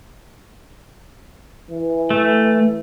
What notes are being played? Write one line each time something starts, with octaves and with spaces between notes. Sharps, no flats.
E3
A3